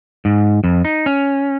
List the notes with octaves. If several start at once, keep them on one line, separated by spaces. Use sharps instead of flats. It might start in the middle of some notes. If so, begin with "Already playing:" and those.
G#2
F2
D#4
C#4